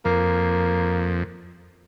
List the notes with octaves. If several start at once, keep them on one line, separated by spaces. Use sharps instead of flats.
F2 A#3